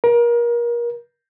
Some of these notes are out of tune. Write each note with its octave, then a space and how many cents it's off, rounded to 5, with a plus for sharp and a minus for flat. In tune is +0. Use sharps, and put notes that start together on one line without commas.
A#4 +30